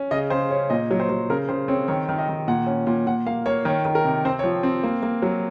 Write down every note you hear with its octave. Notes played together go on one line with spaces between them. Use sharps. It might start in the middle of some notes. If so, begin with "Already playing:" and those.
Already playing: C#4
C#3 D#5
C#3 C5
C#4 C#5
A#2 D#5
F#3
C5
F#3
C#3 A#4
C#3 C5
C4 C#5
D#3 C#5
D#3
D#5
D#3
A#2 F#5
C#4
A#2
A#2 F#5
A#3 F5
A#3 C#5
D#3 C#5
D#3
A#4
C3
C4 C5
C#5
F3
C4
A#3
A#3
F#3